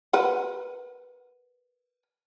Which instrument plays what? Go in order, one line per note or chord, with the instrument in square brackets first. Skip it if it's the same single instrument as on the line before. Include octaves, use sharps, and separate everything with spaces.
[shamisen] A#4 B4 F#5